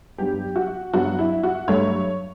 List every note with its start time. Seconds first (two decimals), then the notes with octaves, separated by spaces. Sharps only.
0.18 G2 F#3 B3 G4
0.56 F#4
0.93 G2 F#3 B3 F#4
1.19 E4
1.43 F#4
1.68 G2 F#3 A3 C#5